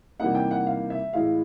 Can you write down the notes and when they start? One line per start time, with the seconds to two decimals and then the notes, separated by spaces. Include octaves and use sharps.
0.20 C3 E3 G3 A#3 D#4 F#5
0.35 G5
0.51 F#5
0.67 F5
0.90 E5
1.13 A2 E3 G#3 F5